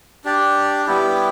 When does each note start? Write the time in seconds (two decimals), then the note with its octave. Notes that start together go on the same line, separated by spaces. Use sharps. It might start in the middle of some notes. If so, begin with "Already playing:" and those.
0.25 D4 G4 D5
0.86 G3 B3 E4 G4